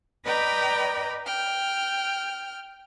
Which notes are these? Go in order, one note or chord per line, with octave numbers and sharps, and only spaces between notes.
B4 D5 D#5 G5 A#5 B5
G5 F6